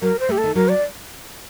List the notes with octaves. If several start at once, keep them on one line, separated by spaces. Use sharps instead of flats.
F#3 A#4
C5
A3 G4
A4
D#3
F#3 A#4
D5